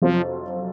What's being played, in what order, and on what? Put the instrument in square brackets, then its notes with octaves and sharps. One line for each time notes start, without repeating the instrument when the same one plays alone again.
[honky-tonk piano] F2 C3 F#3 C4 F4 [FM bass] F3